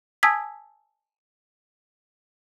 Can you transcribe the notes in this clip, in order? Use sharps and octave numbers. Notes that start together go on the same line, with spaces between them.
G#5 A5 D#6 E6 G#6 B6